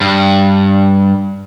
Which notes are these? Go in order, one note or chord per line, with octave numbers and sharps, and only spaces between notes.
G2